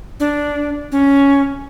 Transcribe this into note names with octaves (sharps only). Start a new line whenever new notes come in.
D4
C#4